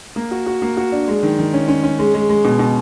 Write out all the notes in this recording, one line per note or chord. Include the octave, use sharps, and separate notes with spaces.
A#3
F#4
F#4
A#3
F#4
D4
G#3
D#3
D#3
C#4
C#4
C#4
G#3
G#3
G#3
B2
B2